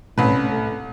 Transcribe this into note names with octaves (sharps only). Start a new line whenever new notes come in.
C2 A2 C#4 B4
A3